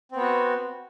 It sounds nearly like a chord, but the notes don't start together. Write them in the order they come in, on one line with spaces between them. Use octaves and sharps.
C4 B3 F#4